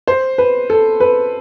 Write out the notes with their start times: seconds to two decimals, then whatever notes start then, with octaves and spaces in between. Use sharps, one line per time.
0.08 C5
0.38 B4
0.70 A4
1.00 B4